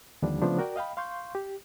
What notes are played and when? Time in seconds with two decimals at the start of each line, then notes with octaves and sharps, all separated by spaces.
0.22 D#2 D3 F3 G3 D4
0.42 C#3 F3 A3 B3 C4 D4
0.59 F#4 A#4 D5 G5
0.76 D#5 F5 G5 B5
0.97 F5 C6 C#6 G6
1.35 G4